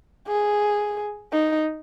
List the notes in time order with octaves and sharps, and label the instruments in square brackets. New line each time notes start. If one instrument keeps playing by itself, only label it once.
[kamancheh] G#4
D#4